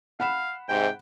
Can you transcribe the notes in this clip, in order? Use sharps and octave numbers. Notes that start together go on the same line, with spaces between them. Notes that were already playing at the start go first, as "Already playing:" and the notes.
F5 F#5 B5 E7
G#2 C3 G5